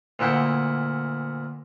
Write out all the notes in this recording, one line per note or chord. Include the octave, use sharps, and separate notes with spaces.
D2 A#2 E4 F#5 G5 D#6